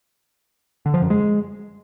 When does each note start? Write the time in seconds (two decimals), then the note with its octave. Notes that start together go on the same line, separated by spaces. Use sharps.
0.86 D3
0.94 F3
1.02 F#2
1.10 G#3